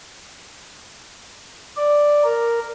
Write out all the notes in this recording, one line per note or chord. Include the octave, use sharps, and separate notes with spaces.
D5
A#4